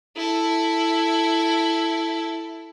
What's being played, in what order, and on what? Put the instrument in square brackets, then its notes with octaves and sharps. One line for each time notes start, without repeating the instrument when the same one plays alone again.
[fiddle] E4 A4